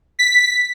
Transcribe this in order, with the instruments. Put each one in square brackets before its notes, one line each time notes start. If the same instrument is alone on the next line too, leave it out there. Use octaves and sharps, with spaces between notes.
[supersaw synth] B6